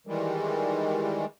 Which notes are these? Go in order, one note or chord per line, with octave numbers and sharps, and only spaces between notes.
D#3 E3 G3 G#3